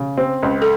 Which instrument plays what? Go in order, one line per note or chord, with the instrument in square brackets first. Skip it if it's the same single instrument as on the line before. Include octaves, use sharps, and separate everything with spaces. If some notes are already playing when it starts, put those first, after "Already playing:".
Already playing: [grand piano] C#3
C4
C#2
[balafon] A4